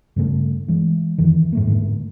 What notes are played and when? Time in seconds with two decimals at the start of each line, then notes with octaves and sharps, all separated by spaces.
0.16 G2 C#3 A3
0.68 E3 G#3
1.18 F2 D#3 E3
1.53 G#2 A3 A#3
1.67 G#2 D3 A#3